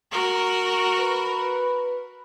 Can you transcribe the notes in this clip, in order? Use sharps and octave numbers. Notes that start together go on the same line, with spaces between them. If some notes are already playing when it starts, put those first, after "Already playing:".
F#4 A#4
B4